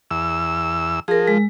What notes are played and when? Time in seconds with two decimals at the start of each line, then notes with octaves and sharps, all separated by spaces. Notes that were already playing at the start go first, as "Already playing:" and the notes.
0.11 E2 E6
1.08 F3 G#4 A#4
1.28 G#3